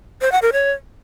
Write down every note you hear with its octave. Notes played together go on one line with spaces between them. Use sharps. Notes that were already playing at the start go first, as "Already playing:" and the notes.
C5
F#5
A#4
C#5